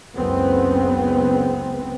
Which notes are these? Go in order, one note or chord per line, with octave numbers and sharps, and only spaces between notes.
F#1 C#2 C#3 B3 C4